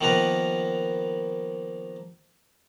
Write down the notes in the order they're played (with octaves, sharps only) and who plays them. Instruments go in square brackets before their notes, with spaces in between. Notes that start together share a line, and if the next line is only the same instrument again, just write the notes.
[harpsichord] D#3 F3 A#3 B3 A#4 B4